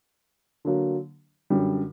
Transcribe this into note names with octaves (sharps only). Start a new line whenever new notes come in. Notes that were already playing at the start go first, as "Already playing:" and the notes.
D3 F#3 A#3
F#2 D3 G3